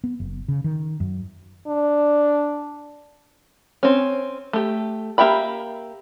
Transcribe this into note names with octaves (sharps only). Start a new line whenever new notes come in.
B3
F#1
C#3
D#3
F#2
D4
C4 C#4
A3 G4
A#3 G4 E5 G5 B5